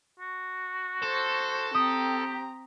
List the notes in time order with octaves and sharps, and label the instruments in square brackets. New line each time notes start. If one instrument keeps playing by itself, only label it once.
[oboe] F#4
[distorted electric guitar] A4 [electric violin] C5
[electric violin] C4 A#5 [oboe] G4 [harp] D#6